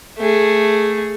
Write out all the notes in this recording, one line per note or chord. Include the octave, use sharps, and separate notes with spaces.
A3 G#4